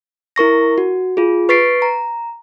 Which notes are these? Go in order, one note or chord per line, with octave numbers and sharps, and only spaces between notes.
E4 A#4 C#6 A#6
F#4
F4 G#4
B4 C#6 A6 B6 C7 D7
A#5